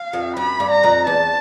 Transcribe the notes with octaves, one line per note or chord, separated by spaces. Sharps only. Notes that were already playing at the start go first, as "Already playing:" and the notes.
Already playing: F5
F2
F#2 B5
G2
A#5
F2
E2 A5